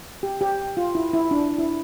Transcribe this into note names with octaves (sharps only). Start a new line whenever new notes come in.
G4
G4
F4
E4
E4
D4
E4